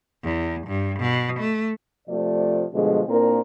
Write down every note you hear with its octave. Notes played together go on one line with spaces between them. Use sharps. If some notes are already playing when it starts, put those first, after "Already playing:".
E2
G2
B2
A3
C3 F3 A3 D5
B2 D3 F3 G3 G#3
A#2 A#3 C4 D4 E4 A#4